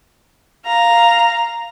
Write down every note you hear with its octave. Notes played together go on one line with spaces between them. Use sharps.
F5 A#5